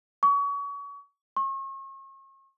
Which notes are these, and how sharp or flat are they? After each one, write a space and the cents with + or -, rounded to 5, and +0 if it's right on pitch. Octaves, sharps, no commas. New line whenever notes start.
C#6 +30
C#6 -40